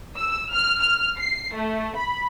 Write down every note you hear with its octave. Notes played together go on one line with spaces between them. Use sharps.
E6
F6
F6
C7
A3
B5